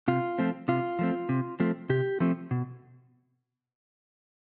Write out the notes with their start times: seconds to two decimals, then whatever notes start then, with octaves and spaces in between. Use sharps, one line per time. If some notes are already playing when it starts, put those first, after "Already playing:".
0.08 C3 F4
0.38 F3 A3 C4
0.68 C3 F4
0.99 F3 A3 C4
1.29 C3
1.60 F3 A3 C4
1.89 C3 G4
2.20 F3 A3 C4
2.51 B2